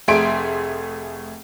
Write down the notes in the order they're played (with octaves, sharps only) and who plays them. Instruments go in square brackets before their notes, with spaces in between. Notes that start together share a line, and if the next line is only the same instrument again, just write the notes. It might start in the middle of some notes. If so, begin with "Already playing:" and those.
[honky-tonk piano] F1 A3 G#4 E5 C6 D7